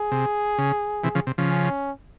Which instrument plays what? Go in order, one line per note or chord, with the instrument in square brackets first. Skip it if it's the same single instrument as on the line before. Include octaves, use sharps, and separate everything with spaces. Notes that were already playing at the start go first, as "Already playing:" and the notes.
Already playing: [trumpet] G#4
[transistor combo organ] C3
C#3
C3 E3
C#3 F3
C3
C#3 F3
[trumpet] C#4